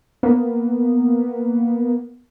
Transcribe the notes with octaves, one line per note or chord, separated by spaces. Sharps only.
A#3 B3